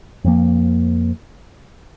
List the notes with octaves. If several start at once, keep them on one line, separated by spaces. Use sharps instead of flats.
F2 F3 A#3